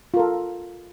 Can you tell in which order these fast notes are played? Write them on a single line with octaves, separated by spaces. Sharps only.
F4 A#4 A4